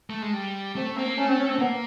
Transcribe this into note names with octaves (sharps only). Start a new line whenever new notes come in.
A3
G#3
G3
A3 C4
A#3 C4
A3 C#4
C4
C#4
C4
A#3 B3